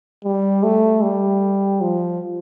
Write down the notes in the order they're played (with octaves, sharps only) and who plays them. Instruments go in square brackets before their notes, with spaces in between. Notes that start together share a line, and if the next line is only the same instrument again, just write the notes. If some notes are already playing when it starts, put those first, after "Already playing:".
[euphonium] G3
A3
G3
F3